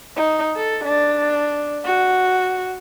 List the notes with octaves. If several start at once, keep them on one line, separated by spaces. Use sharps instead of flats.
D#4
A4
D4
F#4